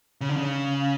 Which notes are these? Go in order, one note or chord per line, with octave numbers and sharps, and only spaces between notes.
C#3
D3
C#3